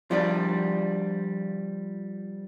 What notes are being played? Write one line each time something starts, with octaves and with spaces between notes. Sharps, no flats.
F3 G3 D4